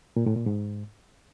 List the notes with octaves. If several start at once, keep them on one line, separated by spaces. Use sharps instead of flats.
A#2
A2
A#2
G#2